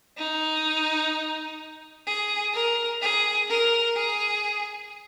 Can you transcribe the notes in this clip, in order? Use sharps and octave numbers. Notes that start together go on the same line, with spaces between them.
D#4
G#4
A#4
G#4
A#4
G#4